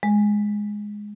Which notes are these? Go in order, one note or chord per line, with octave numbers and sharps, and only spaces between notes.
G#3